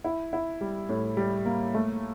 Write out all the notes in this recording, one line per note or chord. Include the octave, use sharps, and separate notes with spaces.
E4
E4
G3
A2
G3
A#3
A3